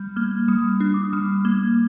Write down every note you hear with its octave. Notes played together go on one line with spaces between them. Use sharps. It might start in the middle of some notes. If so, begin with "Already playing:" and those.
Already playing: G3 G6
A#3 F6
G3 D#6
D4
D6
D#6
G3 F6
A#3